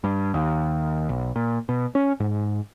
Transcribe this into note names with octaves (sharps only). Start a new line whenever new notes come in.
G2
D#2
B1
A#2
B2
C#4
G#2